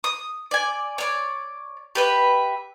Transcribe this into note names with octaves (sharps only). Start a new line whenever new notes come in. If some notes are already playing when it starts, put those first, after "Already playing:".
D#6
D5 G#5
C#5 D5
G4 B4 E5